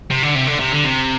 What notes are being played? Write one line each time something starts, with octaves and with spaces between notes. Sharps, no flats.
C3
D3
C3
D3
C3
D3
C3